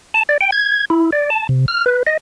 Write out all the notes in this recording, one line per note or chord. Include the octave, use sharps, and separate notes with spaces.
A5
D5
G5
G#6
E4
D5
A5
C3
F6
B4
D#5